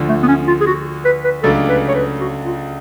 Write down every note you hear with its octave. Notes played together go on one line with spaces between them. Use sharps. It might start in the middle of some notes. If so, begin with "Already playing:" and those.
Already playing: D2 D3 F3
A3
B3
C#4
F4
G#4
F#4
B4
B4
C#2 C#3 F#3 A3 D4 A4
B4
C#5
B4
F#4
F4